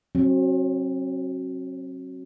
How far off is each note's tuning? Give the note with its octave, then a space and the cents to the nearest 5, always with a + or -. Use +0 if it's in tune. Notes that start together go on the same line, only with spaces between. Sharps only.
F#3 +0 C4 +40